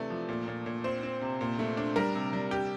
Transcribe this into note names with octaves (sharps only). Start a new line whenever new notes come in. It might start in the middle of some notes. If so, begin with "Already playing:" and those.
Already playing: C3 E3 A3 D5
F3
A#2
A#2
A#2
C4 C5
C4
C3
A#2
A3
D4
G3 A#4
C3
G3
G4